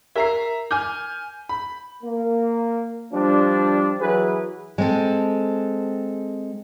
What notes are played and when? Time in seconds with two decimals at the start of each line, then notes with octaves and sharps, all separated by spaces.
0.16 G4 A#4 E5 A#5 C7
0.71 G#5 D6 F6 G6
1.49 B5
2.03 A#3
3.12 F3 G3 D4
4.01 E3 F#3 G#4 B4
4.78 G#3 C4 A4